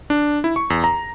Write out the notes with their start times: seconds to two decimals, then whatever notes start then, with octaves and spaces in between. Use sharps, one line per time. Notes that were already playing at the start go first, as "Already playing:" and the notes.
0.10 D4
0.44 E4
0.56 C#6
0.70 E2
0.84 A#5